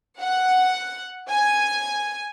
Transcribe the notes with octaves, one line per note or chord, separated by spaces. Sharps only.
F#5
G#5